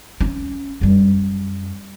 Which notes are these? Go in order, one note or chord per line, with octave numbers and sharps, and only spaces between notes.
C#4 D4
F#2 G3